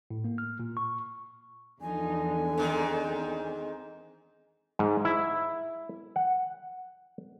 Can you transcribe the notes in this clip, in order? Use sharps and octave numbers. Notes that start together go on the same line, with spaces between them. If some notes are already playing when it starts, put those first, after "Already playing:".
A2
A#3
F6
A#2
C#6
E2 D3 F3 D#4 G#5
G#2 D#3 C4
G#2
E4
F#5